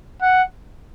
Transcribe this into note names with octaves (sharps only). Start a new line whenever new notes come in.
F#5